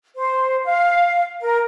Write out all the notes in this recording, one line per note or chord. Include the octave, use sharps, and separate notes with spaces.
C5
F5
A#4